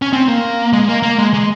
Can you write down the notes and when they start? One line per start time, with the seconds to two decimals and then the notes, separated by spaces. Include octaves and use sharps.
0.02 C#4
0.13 C4
0.28 A#3
0.73 G#3
0.88 A#3
1.03 A#3
1.18 G#3
1.34 G#3